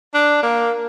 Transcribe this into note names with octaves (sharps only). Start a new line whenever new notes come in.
D4
A#3